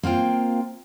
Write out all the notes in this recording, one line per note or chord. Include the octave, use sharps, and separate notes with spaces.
A#3 C4 F4 G5